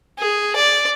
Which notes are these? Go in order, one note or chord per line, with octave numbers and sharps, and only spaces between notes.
G#4
D5